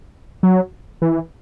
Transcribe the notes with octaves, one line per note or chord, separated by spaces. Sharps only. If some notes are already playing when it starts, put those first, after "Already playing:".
F#3
E3